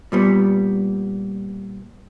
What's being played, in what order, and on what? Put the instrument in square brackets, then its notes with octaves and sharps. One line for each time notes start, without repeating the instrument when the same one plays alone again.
[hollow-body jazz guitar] A#2 G3 B3